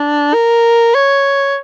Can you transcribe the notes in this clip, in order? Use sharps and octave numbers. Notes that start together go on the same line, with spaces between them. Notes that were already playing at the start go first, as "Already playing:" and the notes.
Already playing: D4
A#4
C#5